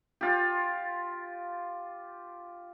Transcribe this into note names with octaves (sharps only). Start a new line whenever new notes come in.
F4 G4